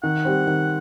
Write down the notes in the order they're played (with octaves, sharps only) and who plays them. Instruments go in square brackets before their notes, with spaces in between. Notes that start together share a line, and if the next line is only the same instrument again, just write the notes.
[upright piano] D#3 [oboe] F#5
[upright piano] G3 C4
D#3